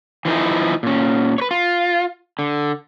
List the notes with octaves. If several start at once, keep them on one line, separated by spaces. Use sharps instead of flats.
E3 F3 D#4 E4
A#2 C#4
B4 C#5
F4
D3